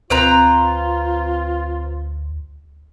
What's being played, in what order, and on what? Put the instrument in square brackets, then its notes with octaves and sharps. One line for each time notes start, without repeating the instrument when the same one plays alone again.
[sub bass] D2 [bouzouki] C4 B4 A#5 [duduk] F4